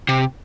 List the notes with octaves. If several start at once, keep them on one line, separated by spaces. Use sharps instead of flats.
C3